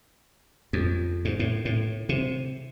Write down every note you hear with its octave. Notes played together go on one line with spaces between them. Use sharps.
F2
G#2
A2
A2
C3